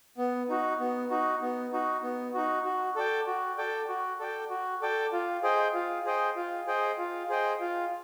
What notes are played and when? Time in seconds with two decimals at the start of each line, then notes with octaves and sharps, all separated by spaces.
0.18 B3
0.49 D#4 F#4
0.80 B3
1.10 D#4 F#4
1.41 B3
1.72 D#4 F#4
2.03 B3
2.34 D#4 F#4
2.65 F#4
2.96 A4 D5 G5
3.27 F#4
3.58 A4 D5 G5
3.88 F#4
4.19 A4 D5 G5
4.50 F#4
4.82 A4 D5 G5
5.12 F4
5.43 G#4 C5 D#5 G5
5.74 F4
6.05 G#4 C5 D#5 G5
6.36 F4
6.67 G#4 C5 D#5 G5
6.98 F4
7.29 G#4 C5 D#5 G5
7.60 F4